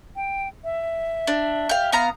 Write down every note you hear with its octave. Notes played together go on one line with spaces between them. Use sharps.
G5
E5
D4
G4 F5
B3 F5 A#5